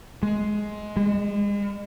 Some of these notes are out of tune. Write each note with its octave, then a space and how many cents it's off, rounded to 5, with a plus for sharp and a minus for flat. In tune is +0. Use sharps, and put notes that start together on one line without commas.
G#3 +15
G#3 -35